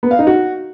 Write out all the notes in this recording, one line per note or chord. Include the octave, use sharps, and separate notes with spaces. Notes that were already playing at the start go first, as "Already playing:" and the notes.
B3
F5
D#4
F#4